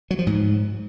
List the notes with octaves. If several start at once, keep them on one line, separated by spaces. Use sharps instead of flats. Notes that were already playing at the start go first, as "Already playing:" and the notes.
F#3
F3
G#2